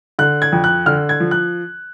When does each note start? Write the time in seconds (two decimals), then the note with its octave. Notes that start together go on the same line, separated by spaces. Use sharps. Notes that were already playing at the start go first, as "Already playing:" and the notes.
0.19 D3 F#6
0.42 G#6
0.52 F2
0.64 F#6
0.86 D3 F6
1.09 G#6
1.20 F3
1.31 F#6